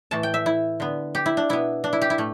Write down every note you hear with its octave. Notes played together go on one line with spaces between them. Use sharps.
A2 E3 A3 A5
G5
E5
E4
D3 B3
G4
E4
D4
B2 B3 E4
D4
E4
G4
E4
A2 A3